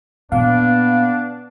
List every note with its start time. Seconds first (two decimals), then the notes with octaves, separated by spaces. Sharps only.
0.32 A#2 B3 D4 F5